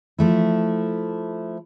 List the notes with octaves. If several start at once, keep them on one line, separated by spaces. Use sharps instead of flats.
F3 A3 E4